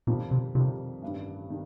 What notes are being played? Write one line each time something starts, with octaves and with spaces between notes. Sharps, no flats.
F2 A#2 D#3 G3
C3
F2 C3 D#3 G3
A1 G2 D#3 G3
D#3 G3